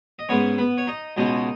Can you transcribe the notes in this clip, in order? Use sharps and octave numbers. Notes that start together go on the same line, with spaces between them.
D#5
G#2 G#3 B3 C#4 C#5
B3 B4
C#5
D#4 D#5
C#2 B2 G#3 C#4 D#4 D#5